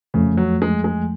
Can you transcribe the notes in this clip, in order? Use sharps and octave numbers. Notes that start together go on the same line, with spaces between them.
F2 C#3 F3 A3
F#3
G#3
G#3